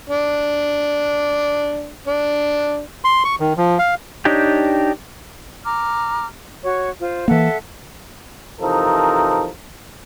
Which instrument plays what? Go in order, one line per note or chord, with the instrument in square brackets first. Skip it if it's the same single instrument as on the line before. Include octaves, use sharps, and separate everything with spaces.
[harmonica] D4
D4
[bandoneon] C6
C#6
D#3
F3
F5
[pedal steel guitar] D4 D#4 G4 C#5 G5
[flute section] A#5 D6 F6
F#4 C#5 C#6
F4 C5
[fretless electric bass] E3 A#3 [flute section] A4 E5 F#5
[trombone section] C3 E3 F3 D#4 A4 A#4